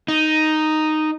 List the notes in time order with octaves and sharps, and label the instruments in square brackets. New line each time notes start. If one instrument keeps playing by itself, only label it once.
[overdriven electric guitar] D#4